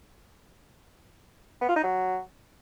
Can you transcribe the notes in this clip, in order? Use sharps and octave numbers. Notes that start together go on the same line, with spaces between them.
B3
F4
D#4
F#3